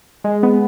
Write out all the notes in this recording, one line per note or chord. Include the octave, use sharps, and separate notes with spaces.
G#3
B3